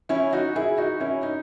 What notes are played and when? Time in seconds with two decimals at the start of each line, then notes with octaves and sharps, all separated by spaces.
0.09 C#4 E4
0.32 D#4 F#4
0.56 E4 G#4
0.78 D#4 F#4
1.00 C#4 E4
1.23 D#4